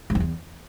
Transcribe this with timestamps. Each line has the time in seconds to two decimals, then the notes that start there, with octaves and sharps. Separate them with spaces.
0.10 G#2
0.15 F2
0.20 E2